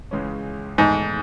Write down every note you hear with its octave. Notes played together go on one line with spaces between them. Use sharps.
C#2 C#3 E3 G#3 C#4
E2 G#2 D#3 A3 D#4 G#4